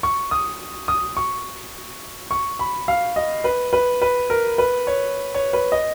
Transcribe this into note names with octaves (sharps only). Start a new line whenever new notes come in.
C#6
D#6
D#6
C#6
C#6
B5
F5
D#5
B4
B4
B4
A#4
B4
C#5
C#5
B4
D#5